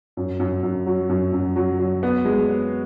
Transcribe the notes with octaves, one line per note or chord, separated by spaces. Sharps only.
F#2
F#2
F#2
F#3
F#2
F#2
F#3
F#3
B3
G#3
B3